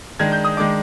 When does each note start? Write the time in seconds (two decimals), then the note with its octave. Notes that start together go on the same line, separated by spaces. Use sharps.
0.19 D#3 G#3 D4 G#6
0.32 G6
0.44 D#6
0.57 D#3 G#3 D4 D6